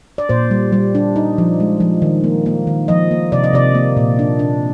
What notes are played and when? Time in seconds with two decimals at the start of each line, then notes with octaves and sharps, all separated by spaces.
0.18 D5
0.29 A#2 C5
0.51 G3
0.72 G3
0.95 D4
1.16 D#4
1.38 F3
1.60 G#3
1.80 F3
2.02 D#3
2.24 A#3
2.46 A#3
2.67 D#3
2.88 F3 D#5
3.11 A#3
3.32 C3 D5
3.44 D#5
3.53 C3 D5
3.75 A#3
3.97 A#2
4.19 D4
4.39 D4